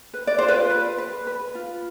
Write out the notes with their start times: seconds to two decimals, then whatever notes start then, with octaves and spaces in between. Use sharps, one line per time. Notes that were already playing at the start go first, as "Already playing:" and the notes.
0.14 B4
0.27 D5
0.38 F4 C5
0.48 B4 D5
0.70 B4
0.98 B4
1.27 B4
1.55 F4